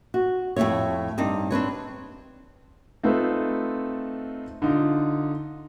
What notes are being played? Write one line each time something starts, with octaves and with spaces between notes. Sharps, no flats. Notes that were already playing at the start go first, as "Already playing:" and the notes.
F#4
F2 A2 D3 A3 C#5
G2 C4 D4 D#4
C4 D4 B4 C#5
A3 C4 D#4 F4 A4 B4
D3 D#4 F4